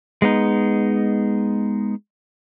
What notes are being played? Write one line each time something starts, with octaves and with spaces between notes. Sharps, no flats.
G#3 B3 D#4